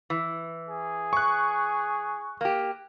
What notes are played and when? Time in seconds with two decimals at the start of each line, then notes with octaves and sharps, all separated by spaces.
0.10 E3
0.69 G#4
1.13 C#6 F#6
2.41 A#3 G4